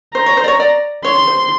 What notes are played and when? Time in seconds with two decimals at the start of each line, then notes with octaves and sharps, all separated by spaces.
0.15 C5 A#5
0.26 C#5
0.37 C5
0.44 D5
0.48 C#5
0.60 D5
1.04 C#5 C6
1.27 C5